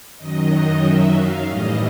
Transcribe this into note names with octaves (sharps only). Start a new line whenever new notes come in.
F#2 D#3 F#3 D#5
D#5
E5
F5
A2 E3 G3 D#5